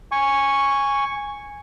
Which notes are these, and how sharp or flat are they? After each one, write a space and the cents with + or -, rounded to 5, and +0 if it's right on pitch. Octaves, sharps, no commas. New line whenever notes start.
G#5 -10 C#6 +0